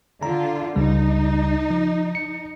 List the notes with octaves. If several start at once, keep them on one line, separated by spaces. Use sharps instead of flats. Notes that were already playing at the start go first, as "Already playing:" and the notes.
D3 F4 A#5
C#2 C#3 G3 D#4
F3
C#7